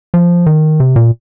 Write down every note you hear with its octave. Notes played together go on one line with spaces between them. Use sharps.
F3
D#3
C3
A#2